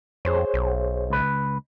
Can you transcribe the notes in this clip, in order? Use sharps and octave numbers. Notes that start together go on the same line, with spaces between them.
F2 G#4 C5 C#5
B1
C#2 B4